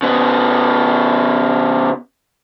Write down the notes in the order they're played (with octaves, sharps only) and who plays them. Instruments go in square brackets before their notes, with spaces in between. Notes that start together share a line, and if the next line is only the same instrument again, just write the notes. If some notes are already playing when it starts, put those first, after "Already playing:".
[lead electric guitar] C#3 B3